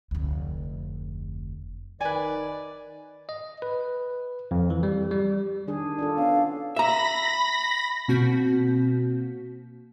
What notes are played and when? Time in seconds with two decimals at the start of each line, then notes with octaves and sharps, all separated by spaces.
0.11 F1 D2
2.01 D#3 B4 D5 G#5
3.29 D#5
3.62 B4
4.51 F2
4.70 E3
4.83 G3
5.11 G3
5.67 D#3 D4 G#4
5.99 D4 F4 A4
6.17 B3 C#4 D4 F5
6.76 E5 A#5 B5 A#6
8.08 B2 A#3 C4 F#4 G6 B6